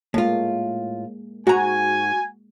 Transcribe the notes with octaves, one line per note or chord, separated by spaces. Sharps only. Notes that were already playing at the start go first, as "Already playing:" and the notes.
A2 G#3 A#3 F4
G#2 F#4 G#5 A#5